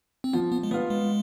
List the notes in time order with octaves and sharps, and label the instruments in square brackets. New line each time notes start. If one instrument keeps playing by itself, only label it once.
[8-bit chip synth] C4
[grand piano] F3 [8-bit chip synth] B3
[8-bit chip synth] B3
G#3
[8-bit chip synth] A3 [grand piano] B3
[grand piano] F4
[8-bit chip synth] G#3